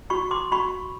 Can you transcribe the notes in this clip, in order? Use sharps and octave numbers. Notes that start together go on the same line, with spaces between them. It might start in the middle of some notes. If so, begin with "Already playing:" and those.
F#4 B5 C#6
C6 D6
F#4 B5 C#6